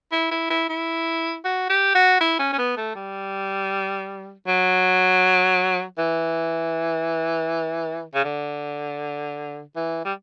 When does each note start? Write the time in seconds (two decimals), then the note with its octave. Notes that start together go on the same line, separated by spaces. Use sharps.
0.12 E4
0.31 E4
0.50 E4
0.69 E4
1.44 F#4
1.69 G4
1.95 F#4
2.21 E4
2.39 C#4
2.53 C#4
2.58 B3
2.77 A3
2.95 G3
4.47 F#3
5.98 E3
8.14 C#3
8.24 D3
9.76 E3
10.05 G3